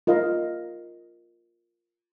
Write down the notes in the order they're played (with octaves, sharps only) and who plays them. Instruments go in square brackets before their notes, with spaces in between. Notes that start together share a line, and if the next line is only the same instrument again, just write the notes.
[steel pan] F4 A#4 D#5 F5